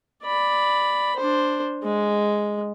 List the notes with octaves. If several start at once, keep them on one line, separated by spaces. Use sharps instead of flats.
D5 B5
D4 C5
G#3